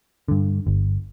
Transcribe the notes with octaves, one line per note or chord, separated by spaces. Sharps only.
G2 D3
G1